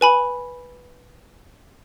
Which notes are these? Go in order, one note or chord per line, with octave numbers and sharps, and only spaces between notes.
B4 G#5 B5